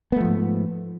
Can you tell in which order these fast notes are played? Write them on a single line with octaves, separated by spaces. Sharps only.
B3 A3 F3 G#2